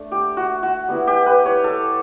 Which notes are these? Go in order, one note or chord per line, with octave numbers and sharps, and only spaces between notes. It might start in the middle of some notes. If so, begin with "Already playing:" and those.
Already playing: A3 D4
G4
F#4
F#4
G3 B3 E4
G4
B4
C#5
A4